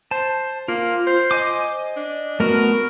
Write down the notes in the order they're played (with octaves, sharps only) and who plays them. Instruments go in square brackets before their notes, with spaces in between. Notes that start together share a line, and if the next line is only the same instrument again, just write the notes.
[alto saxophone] C5 [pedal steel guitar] A5
[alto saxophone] A#3 [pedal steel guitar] F4
[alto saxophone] C5
[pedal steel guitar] D#5 G#5 D6
[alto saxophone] D4
[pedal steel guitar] A3 B3 F#4 [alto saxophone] A#4